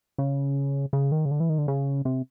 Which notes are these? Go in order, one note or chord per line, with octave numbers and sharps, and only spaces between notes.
C#3
C#3
D#3
C#3
D3
E3
D#3
D3
C#3
C3